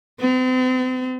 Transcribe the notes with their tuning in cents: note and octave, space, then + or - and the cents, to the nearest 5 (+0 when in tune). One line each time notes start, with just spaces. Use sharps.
C4 -40